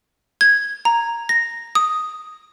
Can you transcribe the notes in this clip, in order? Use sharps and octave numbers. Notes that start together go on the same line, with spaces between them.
G#6
A#5
A#6
D#6